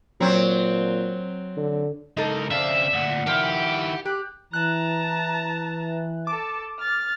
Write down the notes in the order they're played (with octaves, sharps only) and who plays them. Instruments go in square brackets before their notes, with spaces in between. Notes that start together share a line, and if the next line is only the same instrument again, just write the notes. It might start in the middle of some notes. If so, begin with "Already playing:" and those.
[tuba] A#2 [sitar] F#3 C4
[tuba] D3
[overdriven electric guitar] C#2 A#4 [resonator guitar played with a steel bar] D#4 A4
[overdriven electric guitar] C#3 C4 [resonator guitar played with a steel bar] D4 [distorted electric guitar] E5 [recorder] F5
[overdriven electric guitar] D2 A#2 [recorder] F#5
[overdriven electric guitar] D#3 E4 [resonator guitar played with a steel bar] F3 [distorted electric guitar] G4
[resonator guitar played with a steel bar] G4 [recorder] F#6
[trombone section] E3 [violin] A5 A#5 [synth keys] F#6
[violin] A4 A5 [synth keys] D6
[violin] F6 A6